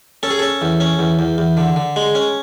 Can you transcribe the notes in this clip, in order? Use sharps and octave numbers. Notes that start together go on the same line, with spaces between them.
C#4 A4
G#4
C#4 A4
E2
C#4
E2
E2
E2
D3
D3
G#3
C#4